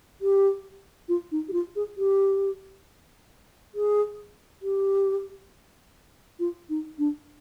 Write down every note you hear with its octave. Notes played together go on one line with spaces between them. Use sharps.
G4
F4
D#4
G4
F4
G#4
G4
G#4
G4
F4
D#4
D4